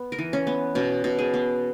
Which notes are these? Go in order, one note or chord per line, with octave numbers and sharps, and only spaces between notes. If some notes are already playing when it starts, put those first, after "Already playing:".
Already playing: B3
A#4
E3
C#4
B3
B2 C#4
B2
G#4
B3